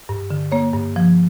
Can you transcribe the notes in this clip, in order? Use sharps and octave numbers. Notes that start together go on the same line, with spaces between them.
G2
D3
A#3 C#5
G2
F3